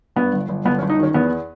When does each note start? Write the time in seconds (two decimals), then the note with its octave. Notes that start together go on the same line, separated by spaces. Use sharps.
0.16 G2 B3
0.33 G1
0.49 G1
0.65 G1 B3
0.78 C#4
0.82 G1
0.90 D#4
0.99 D#3 C#4
1.14 E2 B3